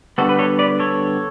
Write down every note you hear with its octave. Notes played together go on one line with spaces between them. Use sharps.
D3 G3 B3 F#4 A4
B4
A4 C#5
B4 D5
A4 C#5